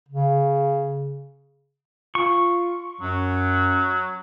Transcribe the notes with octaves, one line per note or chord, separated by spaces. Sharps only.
C#3
F4 C#6
F#2 F#3